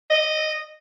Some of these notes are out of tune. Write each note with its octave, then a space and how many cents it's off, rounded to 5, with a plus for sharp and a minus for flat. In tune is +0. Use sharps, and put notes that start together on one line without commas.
D#5 -5